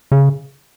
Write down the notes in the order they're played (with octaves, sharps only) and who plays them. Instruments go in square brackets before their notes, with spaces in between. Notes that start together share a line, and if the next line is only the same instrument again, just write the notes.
[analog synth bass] C#3